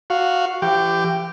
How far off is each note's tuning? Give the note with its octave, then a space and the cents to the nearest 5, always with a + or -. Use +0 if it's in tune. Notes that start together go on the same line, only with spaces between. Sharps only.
F#4 -5 F5 +0
E3 +45 G4 +0